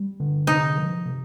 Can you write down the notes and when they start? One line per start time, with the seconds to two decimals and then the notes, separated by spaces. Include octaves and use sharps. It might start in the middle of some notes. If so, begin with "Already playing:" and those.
Already playing: G3
0.20 D3
0.47 C3 D#4
0.77 F3
1.06 C3